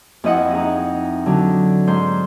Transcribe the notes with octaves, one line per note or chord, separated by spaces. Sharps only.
F2 E4 D#5 F#5
D#4 G#4
D3 F#3
G#2 C5